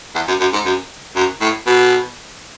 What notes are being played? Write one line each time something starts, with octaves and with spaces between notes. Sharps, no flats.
E2
F#2
F#2
G#2
F#2
F#2
A2
B2